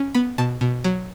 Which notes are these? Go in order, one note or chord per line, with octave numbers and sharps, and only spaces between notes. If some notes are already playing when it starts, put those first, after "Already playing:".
Already playing: C#4
B3 B5
B2 A5
B2
F#3